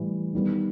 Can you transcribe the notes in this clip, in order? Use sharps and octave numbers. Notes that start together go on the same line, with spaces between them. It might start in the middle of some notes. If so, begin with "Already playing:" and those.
Already playing: A2 E3 G3
D#3 G3 B3